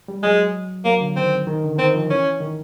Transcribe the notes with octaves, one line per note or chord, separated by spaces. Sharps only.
G3
F#3 G#3
F#3 A#3
D3
D#3 C4
D#3
D3
D#3 C4
F3
E3 C#4
D#3